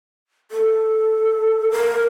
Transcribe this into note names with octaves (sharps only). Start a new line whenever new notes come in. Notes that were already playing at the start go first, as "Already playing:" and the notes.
A4
A#4